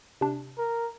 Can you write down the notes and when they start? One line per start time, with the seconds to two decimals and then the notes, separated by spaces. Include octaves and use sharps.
0.21 C3 D4
0.58 A#4